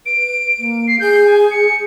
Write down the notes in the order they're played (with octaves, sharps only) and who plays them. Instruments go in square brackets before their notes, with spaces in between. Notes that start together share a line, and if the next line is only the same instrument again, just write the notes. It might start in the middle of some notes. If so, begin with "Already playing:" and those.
[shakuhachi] B4 [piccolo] D7
[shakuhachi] A#3
[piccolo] C7
[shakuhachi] G#4 [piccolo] G6
[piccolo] G#5
C#7